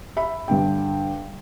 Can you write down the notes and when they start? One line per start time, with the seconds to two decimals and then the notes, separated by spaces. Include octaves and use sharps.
0.17 E5 B5
0.48 G2 D3 G5